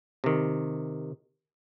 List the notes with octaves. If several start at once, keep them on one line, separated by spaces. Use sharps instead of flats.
C3 D#3